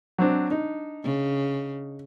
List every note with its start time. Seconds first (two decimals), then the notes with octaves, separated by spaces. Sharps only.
0.18 F#3 C4 D4
0.50 D4 D#4
1.03 C#3